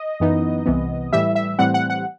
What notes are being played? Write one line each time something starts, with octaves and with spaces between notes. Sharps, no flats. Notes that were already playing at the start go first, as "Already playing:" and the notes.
Already playing: D#5
F#2 E3 B3 D#4
C2 C3 E3 B3
A2 E3 G3 E5
E5
A2 E3 G3 C4 F#5
F#5
F#5